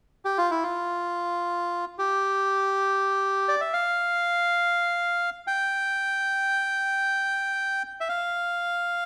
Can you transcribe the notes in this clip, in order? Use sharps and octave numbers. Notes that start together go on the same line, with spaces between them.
G4
F4
E4
F4
G4
D5
E5
F5
G5
E5
F5